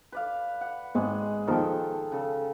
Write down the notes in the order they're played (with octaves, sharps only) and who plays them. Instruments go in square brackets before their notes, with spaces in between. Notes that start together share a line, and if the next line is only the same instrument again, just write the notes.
[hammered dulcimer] B4 D5 F5
F#5
[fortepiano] G#1 [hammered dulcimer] G#3
[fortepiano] D#3 F3 [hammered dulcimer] A4 G5
[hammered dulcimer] C#3 A4